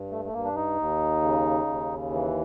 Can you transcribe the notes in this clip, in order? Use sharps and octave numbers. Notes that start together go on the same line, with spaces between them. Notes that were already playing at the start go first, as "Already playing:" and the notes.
Already playing: G2
A3
A3
G2 A#3
D4
D#4
D#2
C#3
D#2
E3